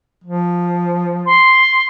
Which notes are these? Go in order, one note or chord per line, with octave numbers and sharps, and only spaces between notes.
F3
C6